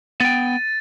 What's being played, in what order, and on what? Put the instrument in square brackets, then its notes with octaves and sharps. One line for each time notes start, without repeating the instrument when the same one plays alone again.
[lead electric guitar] B3 G5 [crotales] A6 D#7